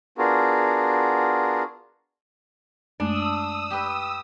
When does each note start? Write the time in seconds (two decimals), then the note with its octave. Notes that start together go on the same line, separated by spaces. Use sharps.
0.18 B3 D4 F4 F#4 G#4 A#4
3.00 F#2 G#3 A3 D4 D#6 E6
3.71 G4 B4